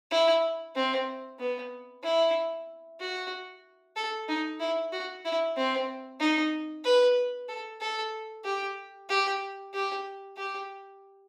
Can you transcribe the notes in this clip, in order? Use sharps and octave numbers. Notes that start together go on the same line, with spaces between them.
E4
C4
B3
E4
F#4
A4
D#4
E4
F#4
E4
C4
D#4
B4
A4
A4
G4
G4
G4
G4